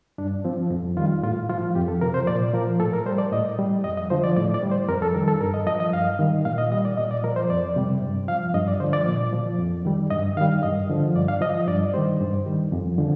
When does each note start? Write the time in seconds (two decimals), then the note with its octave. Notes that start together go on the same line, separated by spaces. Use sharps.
0.18 G2 D4
0.44 F3 C4
0.70 F2
0.97 D#3 G3 F4
1.23 A2 F4
1.49 F3 F4
1.75 F2 G4
1.88 A4
2.01 C3 F3 A#4
2.14 C5
2.27 A#2 D5
2.53 F3 A#4
2.80 A2 A4
2.93 A#4
3.06 G3 C5
3.18 D5
3.32 A2 D#5
3.59 G3
3.84 F2 D#5
3.97 D#5
4.10 D3 F3 C5
4.24 D5
4.36 A2 D5
4.54 D5
4.63 G3
4.71 C5
4.88 F2 A#4
5.02 A4
5.15 D#3 G3 A#4
5.28 A4
5.41 G2 A#4
5.54 D#5
5.67 F3 D#5
5.80 D#5
5.93 G2 F5
6.19 D#3 G3
6.45 A#2 F5
6.58 D#5
6.72 G3 D#5
6.85 D5
6.97 A#2 D#5
7.11 D5
7.23 F3 A#4
7.36 C5
7.50 F2 D5
7.76 C3 G3
8.02 G2
8.28 F3 F5
8.54 G2 D#5
8.68 D5
8.80 D3 C5
8.84 F3
8.93 D5
9.07 A#2
9.33 F3
9.59 F2
9.85 D#3 G3
10.10 G2 D#5
10.37 D#3 G3 F5
10.63 G2 D#5
10.90 D3 F3
11.15 G2 D5
11.28 F5
11.41 F3 D#5
11.54 D#5
11.68 G2 D5
11.94 D#3 G3 C5
12.20 G2
12.46 D#3 G3
12.72 F2
12.98 D3 F3